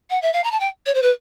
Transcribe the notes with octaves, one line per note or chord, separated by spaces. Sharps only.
F#5
E5
F5
A#5
A5
G5
C#5
C5
B4